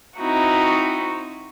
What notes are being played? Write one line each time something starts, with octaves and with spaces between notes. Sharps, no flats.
C4 D#4 E4 F#4